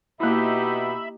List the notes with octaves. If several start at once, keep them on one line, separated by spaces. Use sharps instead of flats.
B2 A#3 D#4 E4 G4 E5 B5